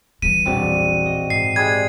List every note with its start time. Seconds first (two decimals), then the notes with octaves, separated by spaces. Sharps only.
0.22 E3 G3 B6 D#7
0.45 E1 A#1 C4 F#4 D5 A5
1.06 D#5
1.30 G#2 C7
1.56 G3 G#3 G#6